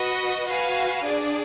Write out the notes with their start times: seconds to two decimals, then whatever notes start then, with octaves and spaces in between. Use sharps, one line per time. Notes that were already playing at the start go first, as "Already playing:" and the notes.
Already playing: F#4 B4 D#5
0.46 F#4 B4 F5 G#5
1.04 D4 G#4 D5